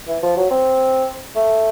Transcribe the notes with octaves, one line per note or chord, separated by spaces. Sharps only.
E3
F3
F#3
C4
A3